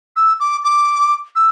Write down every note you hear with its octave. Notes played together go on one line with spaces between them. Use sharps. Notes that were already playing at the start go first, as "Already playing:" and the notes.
E6
D6
D6
E6